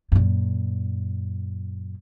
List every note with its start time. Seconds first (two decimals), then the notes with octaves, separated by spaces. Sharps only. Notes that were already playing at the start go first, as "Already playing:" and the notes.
0.12 F#2 A#2